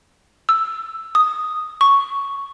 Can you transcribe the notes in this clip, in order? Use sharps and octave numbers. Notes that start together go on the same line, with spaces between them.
E6
D#6
C#6